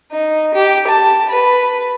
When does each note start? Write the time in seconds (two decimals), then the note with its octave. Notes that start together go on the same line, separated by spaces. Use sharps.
0.11 D#4
0.54 G4
0.87 A5
1.29 B4